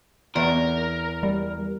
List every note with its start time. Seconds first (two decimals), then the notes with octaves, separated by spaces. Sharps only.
0.36 E2 A#4
1.23 G3